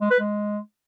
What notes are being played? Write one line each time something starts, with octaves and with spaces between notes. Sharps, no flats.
G#3
B4
G#3